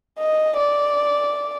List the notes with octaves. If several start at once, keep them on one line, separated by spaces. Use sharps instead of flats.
D#5
D5